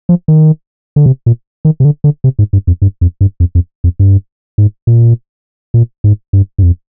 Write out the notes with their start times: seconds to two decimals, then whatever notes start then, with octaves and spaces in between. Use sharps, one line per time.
0.09 F3
0.28 D#3
0.96 D3
1.06 C3
1.26 A#2
1.65 D#3
1.80 C3
1.85 D3
2.04 D3
2.24 C3
2.39 G#2
2.53 G2
2.67 F2
2.82 G2
3.01 F2
3.21 G2
3.40 F2
3.55 F2
3.84 F2
4.00 G2
4.58 G#2
4.87 A#2
5.74 A#2
6.04 G#2
6.33 G2
6.58 G2
6.63 F2